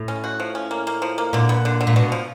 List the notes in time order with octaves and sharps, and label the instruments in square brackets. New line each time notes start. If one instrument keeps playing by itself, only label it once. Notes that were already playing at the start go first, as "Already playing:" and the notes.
Already playing: [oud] A2
[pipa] C#4
F#4
F3
C#4
A#3
A#3
F3
A#3
[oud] A#2 [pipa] D3
[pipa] B3
D3
D3
[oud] A#2
[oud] B2 [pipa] D3
[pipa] F3